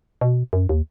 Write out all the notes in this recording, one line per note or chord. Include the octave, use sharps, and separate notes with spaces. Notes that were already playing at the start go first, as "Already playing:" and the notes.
B2
F#2
D#2